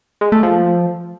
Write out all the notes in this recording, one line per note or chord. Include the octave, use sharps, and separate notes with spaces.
G#3
A3
F3